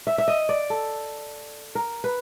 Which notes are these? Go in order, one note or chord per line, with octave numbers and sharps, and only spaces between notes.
E5
E5
D#5
D5
A4
A#4
B4